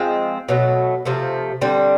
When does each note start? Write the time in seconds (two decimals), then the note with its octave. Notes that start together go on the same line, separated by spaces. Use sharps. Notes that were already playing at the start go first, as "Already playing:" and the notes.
Already playing: F3 G#3 C4
0.48 B2 F#3 A3
1.05 C3 F3 A3
1.61 D3 G3 C4